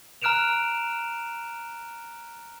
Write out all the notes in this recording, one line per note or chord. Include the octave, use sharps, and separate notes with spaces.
A#5 F6 F#6 D7 E7 F7